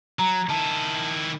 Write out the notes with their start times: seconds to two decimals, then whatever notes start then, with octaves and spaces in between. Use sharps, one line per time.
0.19 F#3 A#5
0.50 D#3 E4 A5